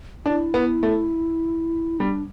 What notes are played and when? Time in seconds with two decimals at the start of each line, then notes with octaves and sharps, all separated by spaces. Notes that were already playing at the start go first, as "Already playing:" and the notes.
0.25 D4 E4
0.54 B3
0.83 A3
1.99 G3 D4